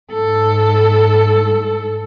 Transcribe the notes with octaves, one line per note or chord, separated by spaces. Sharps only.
G#2 A4